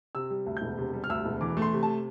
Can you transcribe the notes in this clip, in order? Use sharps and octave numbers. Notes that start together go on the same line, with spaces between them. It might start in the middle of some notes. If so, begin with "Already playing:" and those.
C3 E6
G3
D2
G6
E1
C3
G3
F6
D2 E6
E1
E3 D6
A3
C6
C3
A5